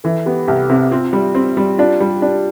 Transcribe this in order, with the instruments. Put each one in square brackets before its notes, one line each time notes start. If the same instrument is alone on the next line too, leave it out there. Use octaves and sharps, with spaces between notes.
[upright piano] E3 [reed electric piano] A4
[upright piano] B3 [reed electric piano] G4
[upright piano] C2 [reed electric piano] G4
[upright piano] C3
[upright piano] C4 [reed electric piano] F4
[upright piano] G3
C4
G3
[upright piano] D4 [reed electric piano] F4
[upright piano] G3 [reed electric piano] G4
[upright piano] D4